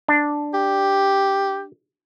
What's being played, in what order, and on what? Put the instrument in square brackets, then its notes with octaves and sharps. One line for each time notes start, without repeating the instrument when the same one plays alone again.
[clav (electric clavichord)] D4
[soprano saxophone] G4